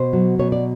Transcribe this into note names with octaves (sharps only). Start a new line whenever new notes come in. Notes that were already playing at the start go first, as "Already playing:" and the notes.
Already playing: B2 C5
F#3
B2 C#5
D5